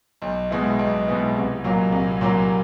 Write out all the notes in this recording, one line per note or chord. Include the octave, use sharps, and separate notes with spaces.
B1
B2 G#3 B3 E4
B1
B2 G#3 B3 E4
C2
A#2 F#3 A#3
C2
A#2 F#3 A#3